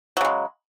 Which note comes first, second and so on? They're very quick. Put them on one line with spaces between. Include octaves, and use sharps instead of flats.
F#3 C#3 G#3